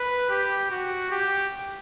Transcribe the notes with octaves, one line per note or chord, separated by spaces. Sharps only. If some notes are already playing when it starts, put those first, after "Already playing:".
Already playing: B4
G4
F#4
G4